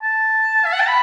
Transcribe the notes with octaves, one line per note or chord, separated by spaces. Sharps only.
A5
E5
F#5
A5
B5